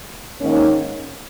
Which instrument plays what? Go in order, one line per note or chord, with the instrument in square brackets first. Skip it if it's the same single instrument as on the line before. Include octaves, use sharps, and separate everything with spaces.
[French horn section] G#2 D#3 A#3 C#4